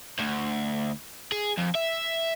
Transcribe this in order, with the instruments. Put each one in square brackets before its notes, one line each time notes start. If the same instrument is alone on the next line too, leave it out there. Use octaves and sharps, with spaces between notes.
[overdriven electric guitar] D2
G#4
F2
E5